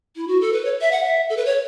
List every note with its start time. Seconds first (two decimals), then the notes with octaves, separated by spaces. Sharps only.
0.16 E4
0.28 F#4
0.41 A4
0.53 B4
0.65 C#5
0.81 E5
0.92 F#5
1.04 E5
1.30 A4
1.37 B4
1.46 C#5